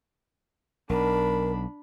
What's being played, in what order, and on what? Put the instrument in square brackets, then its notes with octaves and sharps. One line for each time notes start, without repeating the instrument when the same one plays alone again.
[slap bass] B1 [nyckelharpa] D4 B5 [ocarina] A#4